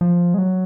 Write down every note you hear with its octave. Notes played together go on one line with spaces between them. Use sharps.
F3
G#3
F#3